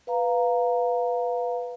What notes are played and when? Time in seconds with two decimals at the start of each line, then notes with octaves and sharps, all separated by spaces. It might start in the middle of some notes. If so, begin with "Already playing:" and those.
0.07 B4 F5 A#5